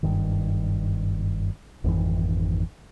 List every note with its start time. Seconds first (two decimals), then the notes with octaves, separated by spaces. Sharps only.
0.03 F#1 G2 D#3
1.84 G#1 F2 D#3 E3